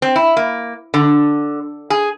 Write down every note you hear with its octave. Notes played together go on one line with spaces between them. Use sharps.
C4
E4
A#3
D3
G#4